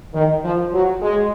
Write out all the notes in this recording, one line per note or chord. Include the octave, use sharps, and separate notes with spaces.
D#3
F3
F#3
G#3